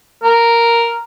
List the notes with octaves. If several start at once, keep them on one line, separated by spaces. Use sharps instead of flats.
A#4